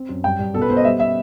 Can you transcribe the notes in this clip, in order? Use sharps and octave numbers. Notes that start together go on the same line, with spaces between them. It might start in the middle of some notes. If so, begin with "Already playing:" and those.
Already playing: C4
F#2
G2 G5
G2
B2 A4
B4
B3 C5
D#5
G3 E5
B3 E5